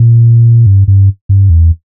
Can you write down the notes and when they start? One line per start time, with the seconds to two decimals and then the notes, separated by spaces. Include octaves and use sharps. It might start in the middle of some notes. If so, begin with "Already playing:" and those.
Already playing: A#2
0.66 G2
0.88 G2
1.29 G2
1.50 E2